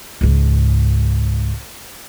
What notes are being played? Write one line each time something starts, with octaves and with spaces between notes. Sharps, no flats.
C#2 G#2